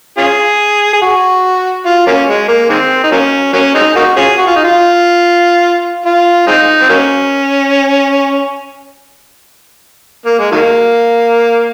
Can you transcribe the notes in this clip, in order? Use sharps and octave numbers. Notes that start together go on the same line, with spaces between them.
C#4 F4 G#4
G#4
F#4
F4
F#3 A#3 C#4
G#3
A#3
D#3 G#3 C4
D#4
F#3 A#3 C#4
F#3 A#3 C#4
G#3 C4 D#4
A#3 D#4 F#4
C#4 F4 G#4
F#4
F4
D#4
F4
F4
G#3 C4 D#4
C4
F#3 A#3 C#4
A#3
G#3
D#3 F#3 A#3